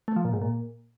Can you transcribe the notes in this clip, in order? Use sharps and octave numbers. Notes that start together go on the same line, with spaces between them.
A3
F3
A#2
G#2
A#2